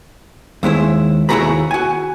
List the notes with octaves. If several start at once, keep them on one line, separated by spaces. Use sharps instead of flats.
D#2 G#3 E4 C5
D#2 E4 F#4 G#4 A#5 B5
F#4 G#5